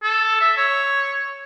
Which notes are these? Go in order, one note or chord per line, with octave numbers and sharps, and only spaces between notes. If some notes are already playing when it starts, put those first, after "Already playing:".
A4
E5
C#5